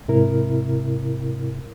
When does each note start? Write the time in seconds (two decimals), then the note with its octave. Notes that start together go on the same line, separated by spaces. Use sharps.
0.08 G#2 C3 E4 A#4